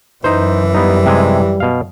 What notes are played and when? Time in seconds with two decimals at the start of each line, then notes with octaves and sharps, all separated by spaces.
0.24 F#2 E3 D#4 C5
0.74 G3 B3 D#4
1.06 C3 G#3 G#5
1.60 B2 F5